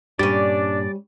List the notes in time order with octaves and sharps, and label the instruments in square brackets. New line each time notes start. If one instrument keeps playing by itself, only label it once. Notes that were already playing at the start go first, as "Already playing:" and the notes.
[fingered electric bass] G2 A#2 [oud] G3 C#4 [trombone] D4 [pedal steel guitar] D5